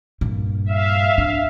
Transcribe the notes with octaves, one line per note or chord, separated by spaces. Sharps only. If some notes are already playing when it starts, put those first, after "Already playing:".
G2 A#2
E5 F5
D4